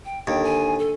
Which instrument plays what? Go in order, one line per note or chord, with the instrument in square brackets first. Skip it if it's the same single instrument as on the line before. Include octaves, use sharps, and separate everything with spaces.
[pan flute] G5
[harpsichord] D#2 [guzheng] D3 [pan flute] G5
[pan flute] G#5
A4